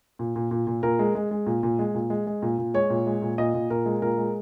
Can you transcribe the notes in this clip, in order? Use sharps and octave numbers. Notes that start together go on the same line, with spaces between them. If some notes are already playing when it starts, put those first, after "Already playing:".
A#2
A#2
A#2
A#2
A#2 A#4
G#3
G#3
G#3
A#2
A#2
G#3
A#2
G#3
G#3
A#2
A#2
G#3 C#5
A#2
G#3
A#2
A#2 D#5
A#2
A#2 A#4
G#3
A#2 A#4
G#3